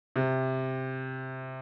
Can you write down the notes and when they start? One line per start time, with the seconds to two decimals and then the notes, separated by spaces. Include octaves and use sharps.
0.16 C3